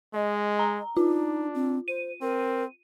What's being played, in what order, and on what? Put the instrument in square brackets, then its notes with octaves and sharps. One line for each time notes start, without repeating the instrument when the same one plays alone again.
[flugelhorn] G#3 [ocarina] D#5
[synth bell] A#5
[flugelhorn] D4 [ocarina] D#4 [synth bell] F4
[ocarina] C4
[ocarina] C5 [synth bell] D#7
[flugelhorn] C4 [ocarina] A#4